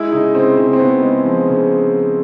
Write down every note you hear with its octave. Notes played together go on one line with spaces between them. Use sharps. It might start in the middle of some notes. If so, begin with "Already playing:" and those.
Already playing: G#3 E4
C#3 D#4
C#3 C4
C#3 C4
C4
C#3 B3
G#3
F3
C#3